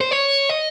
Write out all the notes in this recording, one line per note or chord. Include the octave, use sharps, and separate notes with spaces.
C5
C#5
D#5